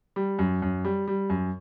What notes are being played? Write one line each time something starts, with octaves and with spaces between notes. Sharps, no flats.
G3
F#2
F#2
G3
G3
F#2